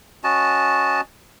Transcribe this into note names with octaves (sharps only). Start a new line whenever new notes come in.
C#4 F#4 D#5 A5